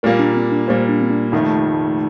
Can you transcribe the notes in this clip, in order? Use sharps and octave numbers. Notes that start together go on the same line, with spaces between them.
A#2 G3 A#3 A#4
D4
C4
D4
A#2 G3 A#3 C5
D4
C4
D4
F1 F2 D#3 A3 D#4